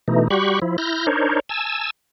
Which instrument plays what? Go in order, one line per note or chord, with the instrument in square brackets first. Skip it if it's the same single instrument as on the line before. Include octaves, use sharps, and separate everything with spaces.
[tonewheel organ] B2 E3 A3 D#4
G3 F#4 G4 B5 C#6
F3 E4
E4 F6 G6 A#6
D4 D#4 A#4 C5 C#5
G#5 A5 E6